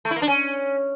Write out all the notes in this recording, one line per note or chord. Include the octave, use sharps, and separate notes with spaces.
A3
E4
A#3
D4
C#4